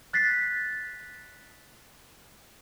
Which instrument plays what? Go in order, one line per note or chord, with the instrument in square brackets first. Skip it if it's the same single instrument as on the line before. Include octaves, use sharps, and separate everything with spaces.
[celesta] F#6 A6 B6 C7